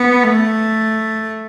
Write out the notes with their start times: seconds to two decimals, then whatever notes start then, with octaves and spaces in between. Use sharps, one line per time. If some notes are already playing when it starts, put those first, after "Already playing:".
Already playing: B3
0.23 A3